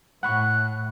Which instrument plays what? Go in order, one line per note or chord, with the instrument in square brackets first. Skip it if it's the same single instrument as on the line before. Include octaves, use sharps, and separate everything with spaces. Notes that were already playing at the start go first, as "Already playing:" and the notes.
[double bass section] A2 [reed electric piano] F#5 B5 C#6 [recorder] F#6